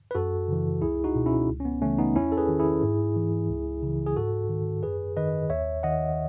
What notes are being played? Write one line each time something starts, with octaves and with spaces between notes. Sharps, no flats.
B4
F#2 F#4 A4
C#3 E3
C#2 E4 G#4
D#4 F#4
B2
C#4 E4
C#2
C#4
B3
C#3 E3 A3 C#4
B3 D#4
E2 C#4 E4
A4
G#4 B4
D#3
E4 G#4
G#2
E3
C#2
C#3 E3
G#4
G#2 F#4 A4
D#3
F#2 G#4 B4
D#3 B4 D#5
D#2 C#5 E5
D#3 D#5 F#5